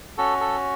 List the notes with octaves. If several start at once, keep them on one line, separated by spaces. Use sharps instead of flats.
C#4 F#4 A4
A4